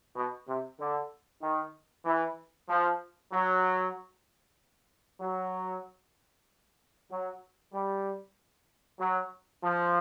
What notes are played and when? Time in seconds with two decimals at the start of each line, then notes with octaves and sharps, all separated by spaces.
0.16 B2
0.48 C3
0.80 D3
1.42 D#3
2.05 E3
2.69 F3
3.32 F#3
5.21 F#3
7.10 F#3
7.73 G3
9.00 F#3
9.63 F3